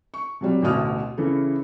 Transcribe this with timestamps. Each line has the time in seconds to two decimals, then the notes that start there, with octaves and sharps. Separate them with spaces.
0.14 C#6
0.41 C3 F#3 G3
0.62 A1 D2 B2 D#6 F6
1.18 C#3 E3 E4 A4